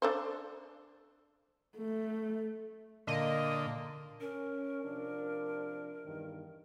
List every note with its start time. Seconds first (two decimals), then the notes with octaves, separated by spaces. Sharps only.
0.02 D4 A4 C5
1.77 A3
3.07 A#2 D3 A#3 D#5
4.21 C#4 A#4
4.83 C3 F3 D4
6.05 E2 G2 D#3